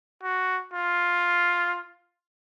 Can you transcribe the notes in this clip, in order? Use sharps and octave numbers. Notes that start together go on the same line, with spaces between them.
F#4
F4